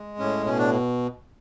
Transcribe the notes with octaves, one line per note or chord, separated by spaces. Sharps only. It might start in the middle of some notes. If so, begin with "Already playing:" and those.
Already playing: G#3
A2 C#4
B2 C#4
D4